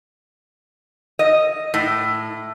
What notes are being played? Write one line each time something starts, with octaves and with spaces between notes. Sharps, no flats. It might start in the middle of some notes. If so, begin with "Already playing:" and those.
D#5
A2